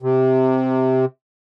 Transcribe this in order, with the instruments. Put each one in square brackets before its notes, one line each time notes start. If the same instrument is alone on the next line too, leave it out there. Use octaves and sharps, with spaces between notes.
[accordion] C3